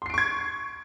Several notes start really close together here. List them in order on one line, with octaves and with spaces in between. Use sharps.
C6 C7 D7 C#6 G#6